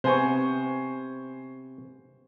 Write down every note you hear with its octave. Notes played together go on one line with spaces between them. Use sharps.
C3 B3 C5 G#5 C#6